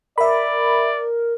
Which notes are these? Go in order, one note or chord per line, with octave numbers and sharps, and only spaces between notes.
A#4 D5 E5 B5